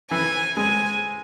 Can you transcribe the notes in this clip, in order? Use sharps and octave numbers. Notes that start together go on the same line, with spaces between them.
E3 G#5
G#3 G#5